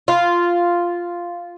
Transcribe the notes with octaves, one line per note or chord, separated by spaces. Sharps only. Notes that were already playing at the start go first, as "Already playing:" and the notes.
F4